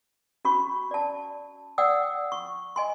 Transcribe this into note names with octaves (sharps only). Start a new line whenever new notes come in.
C#4 F#4 B5 C#6
D5 A5
D5 F#5 G5 D#6 E6
C#6
D#5 G#5 C6